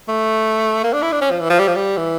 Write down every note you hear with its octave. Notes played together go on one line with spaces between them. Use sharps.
A3
A#3
D4
E4
D4
C#4
F3
E3
F3
G3
F3
G3
E3